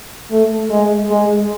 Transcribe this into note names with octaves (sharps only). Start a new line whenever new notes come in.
A3
G#3
G#3